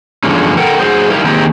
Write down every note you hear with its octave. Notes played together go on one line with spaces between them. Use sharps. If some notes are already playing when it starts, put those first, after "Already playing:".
E2 G2 D3 F3 G#3 C#4
A4 A#4 F#5 G5
F#3 G#4 C5
G3 D#4 E4 G4 A#4 F5
D#3 A#3 C4 G4 G#4 A#4